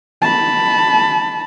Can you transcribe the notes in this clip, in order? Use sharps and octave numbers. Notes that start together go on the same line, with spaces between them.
A5 B5